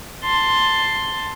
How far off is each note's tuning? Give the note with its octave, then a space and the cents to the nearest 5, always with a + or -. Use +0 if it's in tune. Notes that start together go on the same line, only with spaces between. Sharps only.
A5 +10 C6 +0